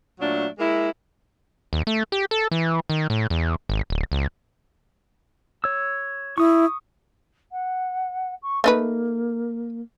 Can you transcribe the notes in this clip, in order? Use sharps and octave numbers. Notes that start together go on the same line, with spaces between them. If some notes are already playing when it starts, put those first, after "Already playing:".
A#2 F#3 A3 D4
G#3 A#3 E4
D#2
A3
G4
A4
E3
D#3
A2
E2
G#1
D1
C#2
C#5 E6
E4 C#6 D#6
F#5
C#6
A3 A#3 D#4 B4